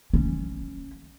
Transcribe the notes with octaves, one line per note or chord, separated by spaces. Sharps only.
C#4